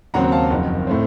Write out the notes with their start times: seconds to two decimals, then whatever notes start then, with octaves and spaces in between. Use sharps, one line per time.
0.14 D#2 C#3 F#3 C4 F#5 A#5
0.32 F5 A5
0.50 F#1 F2 D#3
0.87 A2 A3 C4